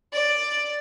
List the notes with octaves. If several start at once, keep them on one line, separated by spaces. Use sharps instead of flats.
D5